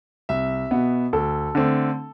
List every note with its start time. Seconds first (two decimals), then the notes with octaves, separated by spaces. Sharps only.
0.29 C2 E5
0.71 B2 B3
1.13 D2 A4
1.55 D3 A3 C4